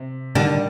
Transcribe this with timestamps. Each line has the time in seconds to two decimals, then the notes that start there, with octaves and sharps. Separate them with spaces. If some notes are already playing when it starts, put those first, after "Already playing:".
Already playing: C3
0.35 D3 D#3 G3 D4 G4